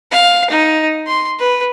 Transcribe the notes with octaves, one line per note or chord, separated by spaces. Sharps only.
F5
D#4
C6
B4